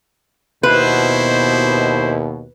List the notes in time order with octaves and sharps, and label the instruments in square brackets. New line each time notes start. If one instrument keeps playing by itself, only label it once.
[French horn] D#2 [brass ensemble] B2 [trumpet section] E4 C5 [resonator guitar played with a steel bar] B4